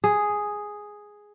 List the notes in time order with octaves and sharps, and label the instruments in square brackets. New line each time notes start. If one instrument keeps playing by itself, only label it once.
[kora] G#4